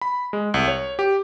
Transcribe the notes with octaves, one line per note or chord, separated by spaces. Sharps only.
B5
G#3
C2
C#5
G4